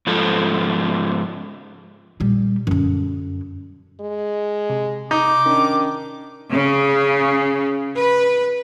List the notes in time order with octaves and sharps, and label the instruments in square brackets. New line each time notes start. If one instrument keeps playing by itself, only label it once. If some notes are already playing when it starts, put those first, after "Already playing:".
[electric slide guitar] G#2 F3 A4
[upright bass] A#2 G3
F#2 D3
[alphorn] G#3
[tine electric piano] C3
[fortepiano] D#4 [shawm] D6
[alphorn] D#3 [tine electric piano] C#4 D4
[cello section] C#3
B4